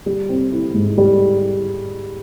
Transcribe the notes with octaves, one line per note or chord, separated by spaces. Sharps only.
G3
C4
E4
G#2
G3